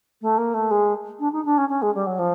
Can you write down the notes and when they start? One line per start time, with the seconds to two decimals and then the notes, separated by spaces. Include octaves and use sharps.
0.21 A3
0.37 A#3
0.54 A3
0.71 G#3
1.19 D4
1.32 D#4
1.45 D4
1.57 C#4
1.69 C#4
1.82 G#3
1.94 G3
2.06 F#3
2.18 F3